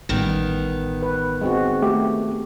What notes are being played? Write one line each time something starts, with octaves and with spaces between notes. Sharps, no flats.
A1 A2 D#3 G3 B3
B4
G#3 C4 F#4
A3 G4